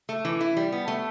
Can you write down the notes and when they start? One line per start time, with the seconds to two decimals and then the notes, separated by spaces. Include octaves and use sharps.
0.09 A3
0.25 E3
0.41 E4
0.57 G3
0.72 B3
0.88 A3